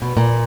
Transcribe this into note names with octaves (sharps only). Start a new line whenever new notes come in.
B2
A#2